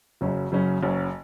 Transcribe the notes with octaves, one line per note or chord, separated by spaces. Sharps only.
F#1 F#2 C#3 F#3 C#4
F#1 F#2 C#3 F#3 C#4
F#1 F#2 C#3 F#3 C#4